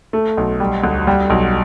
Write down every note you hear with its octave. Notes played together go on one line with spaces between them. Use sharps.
A3
B1
G3
D2
G3
B1